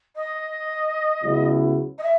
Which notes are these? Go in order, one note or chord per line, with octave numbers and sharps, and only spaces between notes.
D#5
C#2 C#3 F#3 B3 E4
D#5
E5